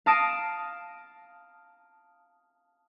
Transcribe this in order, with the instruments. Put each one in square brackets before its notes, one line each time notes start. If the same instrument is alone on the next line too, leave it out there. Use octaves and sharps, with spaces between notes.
[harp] F5 A5 D#6 A#6 D7 E7